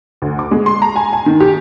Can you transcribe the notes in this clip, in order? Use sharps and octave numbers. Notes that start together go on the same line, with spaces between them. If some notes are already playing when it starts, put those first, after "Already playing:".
D2
D6
G#3
C6
A#5
G#5
G#5
D#3
G4